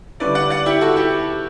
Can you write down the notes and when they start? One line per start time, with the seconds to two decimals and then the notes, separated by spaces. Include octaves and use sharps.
0.20 D3 G3 C#4 E4 B4 D5
0.35 D5 F#5
0.50 D5 F#5
0.66 E4 G4
0.81 F#4 A4
0.96 E4 G4